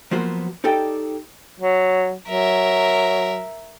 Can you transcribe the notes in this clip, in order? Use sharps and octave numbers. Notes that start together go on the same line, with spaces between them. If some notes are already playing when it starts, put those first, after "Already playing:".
F3 F#3 A#3 B3 F#4 C5
D#4 G4 A4 D5 G5
F#3
F#3 A#4 E5